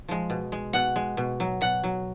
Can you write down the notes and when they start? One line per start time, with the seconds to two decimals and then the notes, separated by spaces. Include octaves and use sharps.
0.08 F3 G#3
0.30 B2
0.52 G#3
0.73 B2 F#5
0.96 G#3
1.17 B2
1.40 F#3
1.61 B2 F#5
1.84 F#3